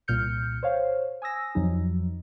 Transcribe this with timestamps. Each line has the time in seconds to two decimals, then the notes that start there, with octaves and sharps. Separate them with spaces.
0.08 C2 A#2 F6 G6 C#7
0.63 C5 C#5 F5
1.22 G#5 D#6 E6 A#6
1.55 F2 F3 F#3 D#4